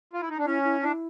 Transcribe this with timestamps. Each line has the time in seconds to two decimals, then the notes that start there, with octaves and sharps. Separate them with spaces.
0.13 F4
0.21 E4
0.30 D#4
0.38 D4
0.46 C#4 E4
0.64 E4
0.82 D4 E4